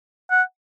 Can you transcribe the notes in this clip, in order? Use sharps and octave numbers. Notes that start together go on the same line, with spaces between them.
F#5